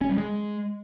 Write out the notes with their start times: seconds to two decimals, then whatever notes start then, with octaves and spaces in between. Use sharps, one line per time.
0.01 C#4
0.09 G3
0.17 G#3